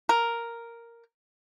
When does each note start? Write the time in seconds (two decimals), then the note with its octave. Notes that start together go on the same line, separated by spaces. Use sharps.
0.09 A#4